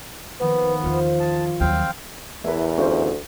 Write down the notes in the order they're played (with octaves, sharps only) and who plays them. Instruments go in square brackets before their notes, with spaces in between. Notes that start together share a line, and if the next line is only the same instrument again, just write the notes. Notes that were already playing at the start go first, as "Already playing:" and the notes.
[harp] D#3 F3 A#3 [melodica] B3 [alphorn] B4
[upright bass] E2 D#3 [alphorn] F4 [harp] C5 F6 C#7
[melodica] A5 [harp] D#6 G#6
[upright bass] D#2 F#3 [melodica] C4 F5 G5
[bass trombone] E2 [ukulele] E4 A#4 B4
[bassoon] D2 [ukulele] C#4 F4 C5